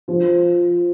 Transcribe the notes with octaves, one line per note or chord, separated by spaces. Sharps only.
F3 F4